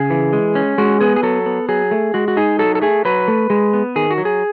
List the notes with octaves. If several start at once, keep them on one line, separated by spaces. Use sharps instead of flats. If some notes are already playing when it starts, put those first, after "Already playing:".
Already playing: C#3 G#4
E3
G#3
C#4
G#3 F#4
B3 G#4
G#4
F#3 A4
B3
F#3 G#4
A3
G#3 F#4
F#4
D#4 G#4
F#3 A4
A4
A3 G#4
F#3 B4
A3
G#3
B3
D#3 G#4
F#4
F#3
G#4